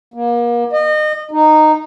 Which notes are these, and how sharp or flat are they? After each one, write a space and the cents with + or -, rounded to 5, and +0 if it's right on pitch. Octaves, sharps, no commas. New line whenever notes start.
A#3 +35
D#5 -30
D#4 -10